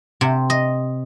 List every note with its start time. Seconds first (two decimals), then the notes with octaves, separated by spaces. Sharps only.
0.21 C3
0.50 D#5